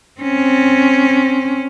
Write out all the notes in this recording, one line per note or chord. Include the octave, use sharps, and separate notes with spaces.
C4 C#4